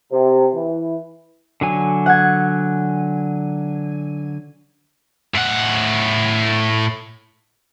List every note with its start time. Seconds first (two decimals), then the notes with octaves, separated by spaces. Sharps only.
0.11 C3
0.54 E3
1.61 D3 F#3 G#5
2.06 F#5 G#6
5.35 A2 F#5